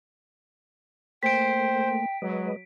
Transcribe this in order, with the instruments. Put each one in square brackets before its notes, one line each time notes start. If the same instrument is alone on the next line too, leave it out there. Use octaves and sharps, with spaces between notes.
[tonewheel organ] A3 A#3 [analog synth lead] C5 [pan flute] G5 [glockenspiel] B6 D7
[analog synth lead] F#3 [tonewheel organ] G#3 B4 D#5